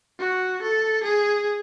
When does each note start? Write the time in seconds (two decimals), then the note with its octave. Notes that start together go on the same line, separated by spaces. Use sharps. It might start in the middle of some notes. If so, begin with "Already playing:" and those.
0.20 F#4
0.62 A4
1.04 G#4